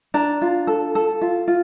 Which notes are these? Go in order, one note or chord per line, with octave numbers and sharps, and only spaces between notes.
D4 A#5
F4
A4
A4
F4
F4